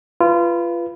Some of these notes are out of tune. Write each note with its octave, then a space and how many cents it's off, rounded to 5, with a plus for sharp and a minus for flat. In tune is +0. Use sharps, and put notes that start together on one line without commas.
F4 -25 B4 +0